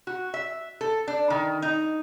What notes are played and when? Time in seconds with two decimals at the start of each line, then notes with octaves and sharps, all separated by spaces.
0.07 F#4
0.34 E5
0.81 A4
1.08 D4
1.30 D#3
1.62 D#4